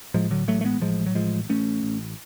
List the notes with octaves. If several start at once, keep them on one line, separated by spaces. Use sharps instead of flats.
A2 F3 G#3
D3 F#3
A1 F#3 A3
A3
G#3 B3
A2 F3 G#3
F#3
A1 F3 G#3
A1 A3 C#4
A1